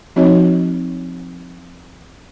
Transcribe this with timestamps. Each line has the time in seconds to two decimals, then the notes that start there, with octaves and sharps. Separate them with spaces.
0.16 F3 C4 D#4 F#4 C#5 D#5